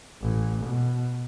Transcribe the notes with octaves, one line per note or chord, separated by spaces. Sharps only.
A1
B2